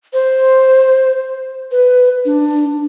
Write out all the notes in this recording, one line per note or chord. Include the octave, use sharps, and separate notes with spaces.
C5
B4
D4